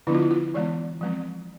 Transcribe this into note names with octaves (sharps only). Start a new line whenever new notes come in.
D3 F3 B3 D4 E4
F4
E4
F4
E3 G#3 B3 D5
F3 G#3 C4